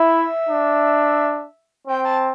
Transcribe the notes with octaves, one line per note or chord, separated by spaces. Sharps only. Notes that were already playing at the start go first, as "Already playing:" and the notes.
Already playing: E4 E5
D4
C4 G5
A5